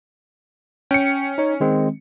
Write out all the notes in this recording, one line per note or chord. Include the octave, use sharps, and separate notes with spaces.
C#4 G5 C#7
D#4 C#5
D#3 G#3 C4